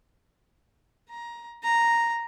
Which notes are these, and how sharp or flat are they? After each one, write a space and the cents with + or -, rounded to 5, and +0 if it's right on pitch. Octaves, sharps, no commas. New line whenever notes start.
A#5 +15
A#5 +0